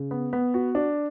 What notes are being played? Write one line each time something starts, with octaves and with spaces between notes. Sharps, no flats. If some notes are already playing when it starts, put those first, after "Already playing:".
Already playing: C#3
B3
B3
F#4
D4